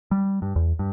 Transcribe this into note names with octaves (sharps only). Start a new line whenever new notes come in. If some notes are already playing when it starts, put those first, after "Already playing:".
G3
G2
E2
G2